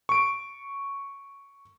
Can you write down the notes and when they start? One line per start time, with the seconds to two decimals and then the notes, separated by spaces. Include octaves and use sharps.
0.09 C#6 D7